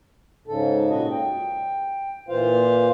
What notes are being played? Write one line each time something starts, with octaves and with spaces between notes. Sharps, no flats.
G#2 C#3 A4
A#2 C#3 F#4 D#5
G5
A#2 E3 F4 C5 F5